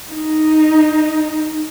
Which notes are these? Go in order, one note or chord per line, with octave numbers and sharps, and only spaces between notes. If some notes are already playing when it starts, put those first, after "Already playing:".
D#4